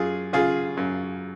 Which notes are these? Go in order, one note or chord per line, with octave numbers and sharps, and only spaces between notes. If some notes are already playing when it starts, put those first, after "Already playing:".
Already playing: F#2 F4 G#4
C#3 F4 G#4
F#2